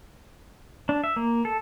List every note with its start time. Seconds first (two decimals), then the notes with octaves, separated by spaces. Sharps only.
0.89 D4
1.04 E5
1.16 A#3
1.45 A4